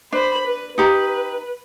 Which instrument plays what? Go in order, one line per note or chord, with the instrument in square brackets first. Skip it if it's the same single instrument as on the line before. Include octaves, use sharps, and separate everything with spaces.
[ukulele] D4 [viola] C5 B5
[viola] B4
[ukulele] D#4 G4 A#5 [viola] B4